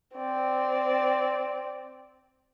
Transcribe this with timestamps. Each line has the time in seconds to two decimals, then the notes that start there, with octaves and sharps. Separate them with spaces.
0.15 C4 D5